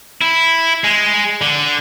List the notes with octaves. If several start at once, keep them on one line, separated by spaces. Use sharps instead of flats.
E4
G#3
D3